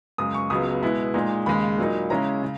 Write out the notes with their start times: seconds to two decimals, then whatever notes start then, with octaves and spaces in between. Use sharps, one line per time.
0.18 F#2 C#3 G#3 D#6
0.34 C#6
0.50 C#2 C#3 F#3 B3 D#6
0.82 B2 G#3 B3 E4
1.14 A#2 G#3 D#4
1.46 D#2 C#3 G#3 B5
1.78 A#2 F#3 A#3 D#4
2.10 C#3 G#3 C#4 E4 A#5
2.43 C#3